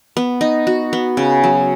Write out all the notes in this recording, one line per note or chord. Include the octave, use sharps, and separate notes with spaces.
B3
D#4
F#4
B3
C#3
F#3